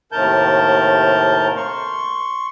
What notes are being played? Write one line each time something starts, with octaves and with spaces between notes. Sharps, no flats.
D#2 A2 C3 A#4 A5 G6
C6 C#6